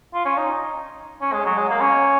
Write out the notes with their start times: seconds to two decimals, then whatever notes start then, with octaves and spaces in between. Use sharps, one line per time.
0.14 F4
0.25 C#4
0.38 D#4
1.21 C#4
1.33 G#3
1.46 F#3
1.58 G#3
1.69 A#3
1.81 C#4